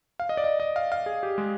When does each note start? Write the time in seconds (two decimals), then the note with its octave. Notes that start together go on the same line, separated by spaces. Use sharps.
0.20 F5
0.29 D#5
0.37 D5
0.44 D#5
0.60 D#5
0.76 F5
0.92 F5
1.06 G#4
1.23 G4
1.38 G#3